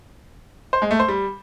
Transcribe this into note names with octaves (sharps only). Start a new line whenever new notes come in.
C5
G#3
A3
C5
G3